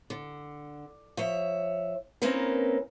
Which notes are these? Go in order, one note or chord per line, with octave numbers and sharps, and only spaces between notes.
D3
F3 C#5 E5
A#3 C4 C#4 D#4 A#4 B4